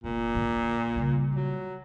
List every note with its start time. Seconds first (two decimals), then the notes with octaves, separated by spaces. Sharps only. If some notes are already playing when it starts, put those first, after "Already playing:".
0.04 F1 A#2
0.35 A#1 D3
0.96 C#3 G3
1.36 F#3